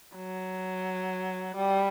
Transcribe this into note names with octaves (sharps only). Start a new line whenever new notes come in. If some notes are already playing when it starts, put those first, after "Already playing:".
F#3
G3